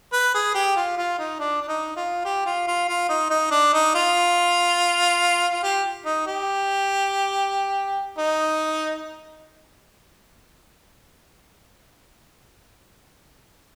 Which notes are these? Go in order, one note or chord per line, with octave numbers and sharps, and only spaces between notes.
B4
G#4
G4
F4
F4
D#4
D4
D4
D#4
F4
G4
F4
F4
F4
D#4
D#4
D4
D#4
F4
F4
G4
D#4
G4
D#4